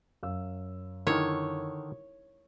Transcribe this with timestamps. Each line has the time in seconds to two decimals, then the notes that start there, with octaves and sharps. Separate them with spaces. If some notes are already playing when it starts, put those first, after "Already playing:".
0.23 F#2 F5 E6
1.07 D3 D#3 D#4 E4 A#4 C#5